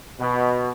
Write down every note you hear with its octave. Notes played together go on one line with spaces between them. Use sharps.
B2